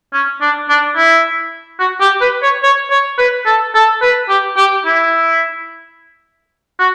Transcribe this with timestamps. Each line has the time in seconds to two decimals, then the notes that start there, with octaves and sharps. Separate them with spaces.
0.13 C#4
0.41 D4
0.69 D4
0.96 E4
1.80 F#4
2.01 G4
2.21 B4
2.42 C#5
2.63 C#5
2.90 C#5
3.18 B4
3.46 A4
3.74 A4
4.02 B4
4.29 G4
4.57 G4
4.85 E4
6.79 F#4